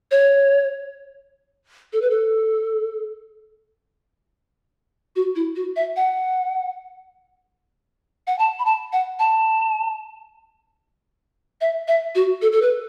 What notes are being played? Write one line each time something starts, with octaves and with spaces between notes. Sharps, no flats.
C#5
A4
B4
A4
F#4
E4
F#4
E5
F#5
F#5
A5
B5
A5
F#5
A5
E5
E5
F#4
A4
A4
B4